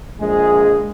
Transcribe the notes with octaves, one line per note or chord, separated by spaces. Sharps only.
A#1 G#3 G#4